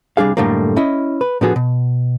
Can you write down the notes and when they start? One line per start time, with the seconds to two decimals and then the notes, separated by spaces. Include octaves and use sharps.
0.17 C2 G3 D4 G#4 F5
0.37 F#2 A2 D3 G3 A3 A#3
0.76 C#4 E4 D#5
1.21 B4
1.41 A2 D3 F3 B3 F#4 G#4
1.56 B2